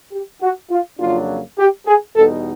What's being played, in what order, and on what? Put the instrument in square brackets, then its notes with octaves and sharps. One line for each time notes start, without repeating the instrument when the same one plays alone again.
[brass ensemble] G4
F#4
F4
F2 C#3 F#3 A#3 D4 F4
G4
G#4
E2 B2 G3 B3 D#4 A4